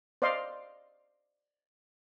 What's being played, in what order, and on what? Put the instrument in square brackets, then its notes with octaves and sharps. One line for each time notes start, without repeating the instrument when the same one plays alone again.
[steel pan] C5 D5 D#5 F5 C6